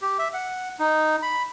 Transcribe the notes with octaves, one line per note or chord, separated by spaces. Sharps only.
G4
E5
F#5
D#4
B5